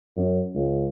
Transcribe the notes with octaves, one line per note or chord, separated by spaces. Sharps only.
F#2
C#2